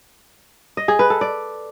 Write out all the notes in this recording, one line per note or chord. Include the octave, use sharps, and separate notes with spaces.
D#5
G#4
B4
A4
D5